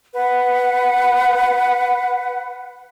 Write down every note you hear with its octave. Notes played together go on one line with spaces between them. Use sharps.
B4 F#5